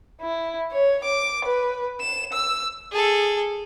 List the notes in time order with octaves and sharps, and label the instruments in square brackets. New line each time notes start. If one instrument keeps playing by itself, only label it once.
[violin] E4
C#5
D6
B4
E7
E6
[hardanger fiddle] G#4 A4